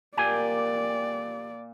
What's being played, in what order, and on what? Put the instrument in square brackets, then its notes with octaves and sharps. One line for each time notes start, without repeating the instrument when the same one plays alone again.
[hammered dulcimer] A#2 [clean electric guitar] G4 G#5 [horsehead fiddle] D5